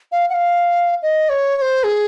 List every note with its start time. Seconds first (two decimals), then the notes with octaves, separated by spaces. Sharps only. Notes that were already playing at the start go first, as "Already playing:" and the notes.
0.12 F5
0.29 F#5
0.34 F5
1.02 D#5
1.29 C#5
1.57 C#5
1.62 C5
1.84 G#4